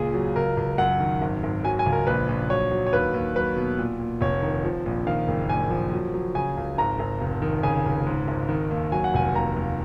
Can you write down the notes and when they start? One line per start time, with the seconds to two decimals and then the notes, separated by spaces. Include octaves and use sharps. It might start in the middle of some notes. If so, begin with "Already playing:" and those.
Already playing: C#2 A#2 G#4
0.14 F#3
0.36 C#2 A#4
0.57 C#2
0.78 F#2 F#5
1.00 D#3
1.21 G#1
1.43 G#1
1.64 F#3 G#5
1.79 G#5
1.86 C#2
1.92 A#4
2.07 A#1 B4
2.29 A#1
2.50 F#3 C#5
2.71 F#3
2.87 C#5
2.93 D#2 B4
3.14 D#2
3.36 F#3 B4
3.56 B2
3.78 A#2
4.00 A#2
4.21 F1 C#5
4.42 D#3
4.65 F3
4.86 A#1
5.07 D#3 F5
5.28 F#1
5.49 A#1 G#5
5.70 F3
5.93 F#3
6.14 F#3
6.35 C#3 G#5
6.57 C#2
6.78 G#1 A#5
6.99 G#1
7.21 F1
7.42 D#3
7.63 C#3 G#5
7.86 C#2
8.06 G#2
8.27 G#1
8.49 D#3
8.71 D#2
8.92 F#3 G#5
9.04 F#5
9.14 F1 G#5
9.35 D#2 A#5
9.57 D#2